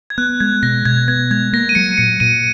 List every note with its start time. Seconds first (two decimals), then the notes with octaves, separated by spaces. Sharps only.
0.10 G#6
0.18 B3 F#6
0.40 G#3 G#6
0.63 B2 A#6
0.85 B2 G#6
1.08 B3 G#6
1.31 G#3 G#6
1.53 A#3 A#6
1.69 D#7
1.75 F#3 C#7
1.98 A#2 C#7
2.20 A#2 D#7